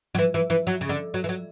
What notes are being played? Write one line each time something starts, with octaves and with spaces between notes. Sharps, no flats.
F#3
E3
E3
E3
F#3
C#3
D3
F#3
E3
F#3